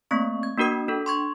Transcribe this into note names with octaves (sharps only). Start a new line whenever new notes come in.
A3 A#3 C4 C#6
G#6
A#3 D4 F#4 A#4 D#6
D4 A4
C6 C#6 G#6